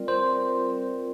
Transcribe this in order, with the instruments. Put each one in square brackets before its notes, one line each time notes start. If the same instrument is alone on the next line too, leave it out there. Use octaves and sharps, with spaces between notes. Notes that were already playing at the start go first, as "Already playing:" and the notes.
Already playing: [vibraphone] G3 C4 F4 A#4 D5
[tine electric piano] C5
[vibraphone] G3 C4 F4 A#4 D5